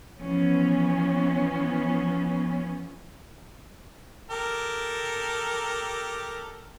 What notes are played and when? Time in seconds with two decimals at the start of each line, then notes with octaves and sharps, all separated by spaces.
0.21 E3 F3 B3 C#4
4.30 G4 A4 A#4